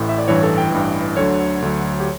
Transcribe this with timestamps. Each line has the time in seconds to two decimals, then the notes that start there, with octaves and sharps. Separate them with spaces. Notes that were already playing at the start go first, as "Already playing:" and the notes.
Already playing: A1 A2
0.09 E5
0.18 D5
0.28 A1 G2 E3 C#5
0.43 A4
0.58 G5
0.72 A1 G2 E3
1.17 D2 D3 F#3 C#5
1.62 D2 D3 F#3
2.00 G4